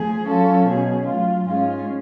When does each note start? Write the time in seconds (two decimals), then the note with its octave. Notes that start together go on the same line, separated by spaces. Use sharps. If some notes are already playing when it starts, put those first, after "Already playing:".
Already playing: F3 A3 G#4
0.25 F#3 C#4 F4 A4
0.66 B2 F#3 C#4 G#4
1.06 F#3 A3 F4
1.46 G#2 G#3 C#4 F4 G#4